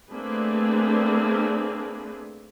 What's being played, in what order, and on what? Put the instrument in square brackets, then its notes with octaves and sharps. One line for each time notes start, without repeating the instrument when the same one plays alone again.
[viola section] A3 A#3 C4 D4 G#4 B4